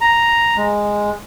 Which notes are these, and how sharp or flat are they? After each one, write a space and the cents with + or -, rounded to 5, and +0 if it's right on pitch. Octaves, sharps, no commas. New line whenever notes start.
A#5 +0
G#3 -5